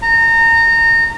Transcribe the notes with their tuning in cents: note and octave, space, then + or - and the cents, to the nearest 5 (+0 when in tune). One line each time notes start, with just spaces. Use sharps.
A#5 -25